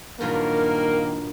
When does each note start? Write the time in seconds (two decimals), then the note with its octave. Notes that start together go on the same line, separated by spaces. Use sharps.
0.20 G2 A#2 D#3 F#3 A#3 A#4